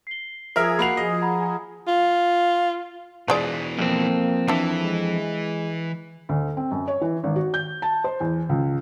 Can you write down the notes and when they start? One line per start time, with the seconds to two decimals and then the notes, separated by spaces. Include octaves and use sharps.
0.07 C7 G7
0.56 F3 G#4 A#4 E5 F6
0.79 A#3 F#4 B5 C7 F7
0.97 G#4 D#5
1.22 F#5 A#5 B5
1.87 F4
3.28 B2 E3 F3 G#3 D5
3.79 F2 A#3 C4
4.48 E3 D4 E4
4.82 G#3
6.29 D2
6.57 C4
6.71 F#2
6.88 C#5
7.01 E3
7.24 G#1
7.36 F#4
7.54 G6
7.82 A5
8.04 C5
8.20 E2
8.49 C#2